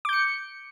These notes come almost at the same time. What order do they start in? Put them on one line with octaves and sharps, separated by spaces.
D6 G6 C#7